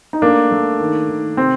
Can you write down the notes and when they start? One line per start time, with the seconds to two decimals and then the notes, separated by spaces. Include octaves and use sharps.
0.13 D#4
0.22 A3 A#3 D4
0.51 A3
0.80 D#3
1.08 D#3
1.37 C3 C4